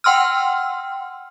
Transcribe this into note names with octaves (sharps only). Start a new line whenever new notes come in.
F#5 G5 C6 E6 F6